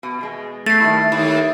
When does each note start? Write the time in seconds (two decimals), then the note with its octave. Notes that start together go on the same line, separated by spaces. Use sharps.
0.03 B2
0.21 B2 G#3
0.66 A3 A6 C7
0.80 D#3 G3 E4
1.12 D#2 E4